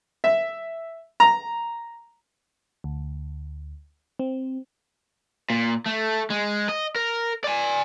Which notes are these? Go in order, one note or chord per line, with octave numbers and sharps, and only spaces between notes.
E5
A#5
D2
C4
A#2
A3
G#3
D#5
A#4
D5 G#5